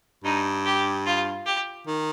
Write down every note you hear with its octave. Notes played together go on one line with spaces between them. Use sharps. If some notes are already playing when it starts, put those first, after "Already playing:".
G2 D#4
G4
F4
G4
D#3